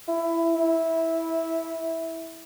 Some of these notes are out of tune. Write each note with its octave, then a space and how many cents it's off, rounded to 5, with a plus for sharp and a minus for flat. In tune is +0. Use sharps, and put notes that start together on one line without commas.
E4 +15
E4 -10